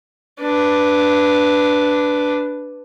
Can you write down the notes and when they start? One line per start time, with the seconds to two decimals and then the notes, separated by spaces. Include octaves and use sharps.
0.41 D4 B4